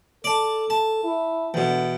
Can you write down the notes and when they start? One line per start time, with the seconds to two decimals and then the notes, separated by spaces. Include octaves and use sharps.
0.24 A4 D5 A5
0.70 A5
1.03 E4
1.54 E2 B2 D3